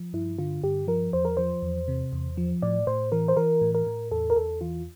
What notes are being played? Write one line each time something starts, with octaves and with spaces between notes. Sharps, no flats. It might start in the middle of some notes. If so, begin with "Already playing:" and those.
Already playing: F3
G2 E4
D3 F4
G2 G4
F3 A#4
E2 C5
A#4
F3 C5
E2
C3
E2
F3
A2 D5
A2 C5
E3 A#4
C5
E3 A#4
A2
A#4
A2
E2 A4
A#4
E2 A4
E3 F4